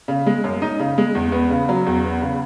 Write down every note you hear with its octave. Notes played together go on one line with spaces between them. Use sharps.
C#3
G#3
F#2
D#4
C#3
G#3
E2
B3
C#3
F#3
E2
B3
C#3